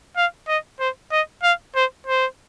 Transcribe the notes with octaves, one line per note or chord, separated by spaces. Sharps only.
F5
D#5
C5
D#5
F5
C5
C5